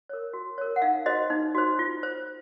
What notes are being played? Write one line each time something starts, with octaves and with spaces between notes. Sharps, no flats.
A#4 C#5
F#4
A#4 C#5
F#5
D#4 F5
F#4 C5 D#5
D#4
F#4 C5
F4
C5